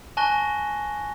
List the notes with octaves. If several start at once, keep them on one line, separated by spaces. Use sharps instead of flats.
G#5 A5 C#6 F#6 A#6 G7